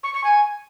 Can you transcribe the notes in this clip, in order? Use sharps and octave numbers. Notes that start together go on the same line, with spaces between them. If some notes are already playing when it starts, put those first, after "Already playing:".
C#6
C#6
G#5